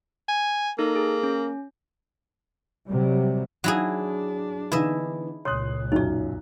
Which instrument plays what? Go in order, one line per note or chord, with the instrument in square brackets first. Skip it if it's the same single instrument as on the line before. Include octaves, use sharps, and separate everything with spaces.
[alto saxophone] G#5
[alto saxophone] A#3 [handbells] D#4 A4
[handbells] G#4
C#4
[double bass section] C3 F#3 G3
[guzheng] F#3 E4 G#4 [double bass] D4
[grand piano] D3 E3 B3 [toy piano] D#4 [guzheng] E4 D#5 E5
[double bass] C#2 A#2 [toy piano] C#5 [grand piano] C6 D#6 F#6
[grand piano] B1 F#2 F4 [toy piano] D#4 D5